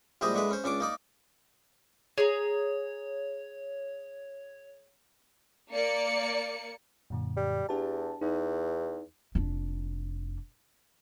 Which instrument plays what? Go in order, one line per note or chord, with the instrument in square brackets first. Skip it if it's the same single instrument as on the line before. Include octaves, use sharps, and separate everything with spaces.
[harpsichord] A#1 G3 G#3 E4 C5 D#5
D3 G#3 E4 B4
C#4 C5
C#2 C#4 D4 A5 D6
A#3 D#4 D5
[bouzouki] G#4 A#5 [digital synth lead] C#5
[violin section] A#3 D5 C#7
[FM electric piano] F#2 A#2 D3
[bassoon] G3
[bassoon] E2 [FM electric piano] D4 G4 A5
[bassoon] E2 [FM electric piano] D#4
[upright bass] F1 D4